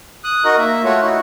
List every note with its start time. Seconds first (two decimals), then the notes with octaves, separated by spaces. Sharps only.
0.24 D#6 F#6
0.45 D#4 F#4 A#4 D#5
0.58 A#3 E5
0.84 A3 F4 F#4 C#5
1.02 D#4 E4 F#4